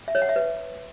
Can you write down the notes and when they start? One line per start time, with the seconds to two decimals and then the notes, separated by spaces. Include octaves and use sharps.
0.08 E5
0.15 C#5
0.22 F#5
0.29 E5
0.36 B4